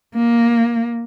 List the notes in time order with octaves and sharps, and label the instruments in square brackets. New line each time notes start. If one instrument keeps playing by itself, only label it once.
[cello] A#3